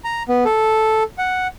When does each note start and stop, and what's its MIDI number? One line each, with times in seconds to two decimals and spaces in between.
0.04 0.23 82
0.29 0.44 59
0.45 1.03 69
1.18 1.47 78